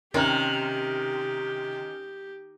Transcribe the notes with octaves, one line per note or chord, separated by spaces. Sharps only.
C3 D#3 C#4 G4 A#4